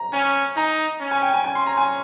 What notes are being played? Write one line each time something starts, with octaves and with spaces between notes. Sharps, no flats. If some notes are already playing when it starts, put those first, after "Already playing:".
Already playing: A#5
C#4 G#5
D#4 A#5
C#4
G#5
G5
G#5
C#4 G#5
C6
A#5
G#5